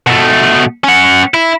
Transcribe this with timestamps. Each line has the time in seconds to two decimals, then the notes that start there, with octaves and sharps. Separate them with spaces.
0.07 B2 A3
0.84 C#4 F#5
1.34 E4